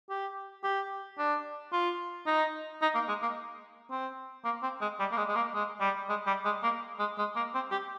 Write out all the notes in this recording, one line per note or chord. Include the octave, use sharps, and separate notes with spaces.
G4
G4
D4
F4
D#4
D#4
A#3
G#3
A#3
C4
A#3
C4
G#3
G3
A#3
G#3
G#3
A#3
G#3
G3
G#3
G3
G#3
A#3
G#3
G#3
A#3
C4
G4